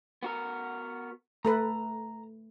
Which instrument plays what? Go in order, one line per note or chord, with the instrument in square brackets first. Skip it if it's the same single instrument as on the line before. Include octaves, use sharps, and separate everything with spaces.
[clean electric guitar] B3 F#4 A#4
[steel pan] A3 A4 B4 [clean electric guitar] A#5